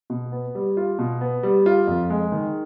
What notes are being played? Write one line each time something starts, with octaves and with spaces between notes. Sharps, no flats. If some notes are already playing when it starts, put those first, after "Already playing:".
B2
B3
G3
F4
B2
B3
G3
F4
F2
G#3
D#3